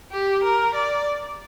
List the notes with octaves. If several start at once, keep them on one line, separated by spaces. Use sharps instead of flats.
G4
A#4
D5